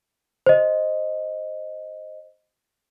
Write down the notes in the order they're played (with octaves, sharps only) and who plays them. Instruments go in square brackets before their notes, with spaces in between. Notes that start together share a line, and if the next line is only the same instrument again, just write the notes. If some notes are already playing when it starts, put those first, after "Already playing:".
[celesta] C5 D#5